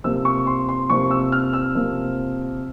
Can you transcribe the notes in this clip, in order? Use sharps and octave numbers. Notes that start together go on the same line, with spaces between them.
C3 F3 A#3 E6
C#6
C6
C6
C3 F3 A#3 C#6
E6
F6
E6
C3 F3 A#3